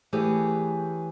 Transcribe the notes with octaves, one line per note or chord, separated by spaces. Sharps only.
E3 A3 G4 G#4 B4 C#5